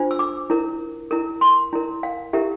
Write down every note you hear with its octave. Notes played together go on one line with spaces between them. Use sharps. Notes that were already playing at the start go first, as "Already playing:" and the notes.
Already playing: D4 F4 C5
E6
D6
E4 A#4
E4 A#4
C6
E4 A#4
F5
E4 G4 A#4 E5